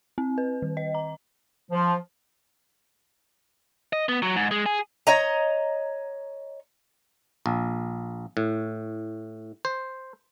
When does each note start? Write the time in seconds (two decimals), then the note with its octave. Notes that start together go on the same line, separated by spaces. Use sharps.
0.18 C4
0.38 B4
0.62 D#3
0.77 D#5
0.95 A#5
1.71 F3
3.93 D#5
4.09 B3
4.22 F#3
4.36 G#2
4.51 G#3
4.66 G#4
5.07 C#5 D#5 A#5
7.46 A#1
8.37 A2
9.65 C5